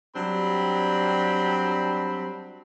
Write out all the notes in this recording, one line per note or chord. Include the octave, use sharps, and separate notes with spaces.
F#3 G3 C4 D4 B5